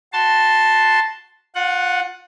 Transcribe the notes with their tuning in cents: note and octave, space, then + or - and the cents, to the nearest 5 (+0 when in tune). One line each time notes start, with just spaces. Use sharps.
F#4 +0 A5 +0 C6 +0
F4 +30 F#5 +0